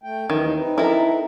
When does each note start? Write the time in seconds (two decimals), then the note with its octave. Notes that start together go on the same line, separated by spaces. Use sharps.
0.03 A3 G5
0.30 D#2 D#3 E3 D#4
0.57 C4 D#4 B4
0.78 E4 A4 A#4